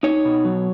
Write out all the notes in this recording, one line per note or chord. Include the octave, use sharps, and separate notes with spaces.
D#4 C#5
B2
F#3